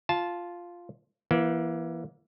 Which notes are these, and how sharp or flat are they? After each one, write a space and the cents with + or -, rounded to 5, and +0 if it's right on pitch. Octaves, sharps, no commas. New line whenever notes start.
F4 +0 A5 -15
E3 +20 A#3 +40